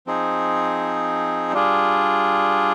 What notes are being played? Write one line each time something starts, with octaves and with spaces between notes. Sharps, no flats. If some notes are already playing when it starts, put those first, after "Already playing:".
F3 C4 D#4 G#4
G3 D4 F4 G#4